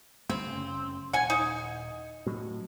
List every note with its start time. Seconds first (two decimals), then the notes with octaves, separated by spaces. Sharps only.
0.29 D2 G2 A3 C4
0.47 F#1 C#3
1.13 D#1 F#5 G#5
1.30 D#4
2.26 A2 F#3